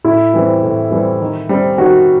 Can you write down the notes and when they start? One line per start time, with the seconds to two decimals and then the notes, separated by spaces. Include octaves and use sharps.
0.04 A2 E4
0.34 E3 G3 C4
0.63 A2
0.91 E3 G3 C4
1.21 D#3
1.49 G3 C4
1.78 D#3 F#4